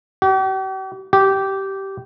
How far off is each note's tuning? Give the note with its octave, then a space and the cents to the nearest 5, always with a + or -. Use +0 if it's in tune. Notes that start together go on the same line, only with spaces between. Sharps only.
G4 -45
G4 -15